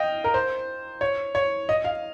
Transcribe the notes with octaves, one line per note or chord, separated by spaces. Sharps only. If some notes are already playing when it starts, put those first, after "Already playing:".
Already playing: D#5 F5 G5
A#4
C5
C#5
C#5
D#5
F5